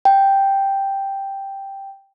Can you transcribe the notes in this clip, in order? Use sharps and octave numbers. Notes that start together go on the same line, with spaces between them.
G5